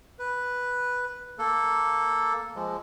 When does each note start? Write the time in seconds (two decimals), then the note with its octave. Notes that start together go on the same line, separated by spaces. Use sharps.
0.19 B4
1.39 A#3 A4
2.56 F3 G#3